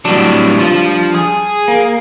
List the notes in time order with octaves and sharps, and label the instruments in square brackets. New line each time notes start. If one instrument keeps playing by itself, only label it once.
[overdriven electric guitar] A2 F#3 [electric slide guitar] G3 D4
[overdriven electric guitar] F3
G#4
[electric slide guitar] A#3